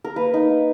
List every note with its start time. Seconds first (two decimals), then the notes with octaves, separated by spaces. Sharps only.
0.04 A#4
0.16 A#3 B4
0.34 D#4
0.50 A#3